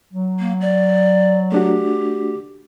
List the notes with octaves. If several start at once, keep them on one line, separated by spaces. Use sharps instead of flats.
F#3
A#3
D5
A3 D4 F#4 G4